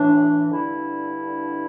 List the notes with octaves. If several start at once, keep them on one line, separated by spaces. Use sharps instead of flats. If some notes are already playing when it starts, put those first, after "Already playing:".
Already playing: A2 E3 D4
G2 D3 E4